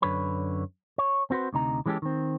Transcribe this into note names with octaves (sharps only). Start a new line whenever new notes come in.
F#2 D3 B4 C#5 B5
C#5
C4 F#4 B4 C5
D2 C3 D#4 A#5
E3 G#3 C#4 D#4 G4 A4
D#3 C4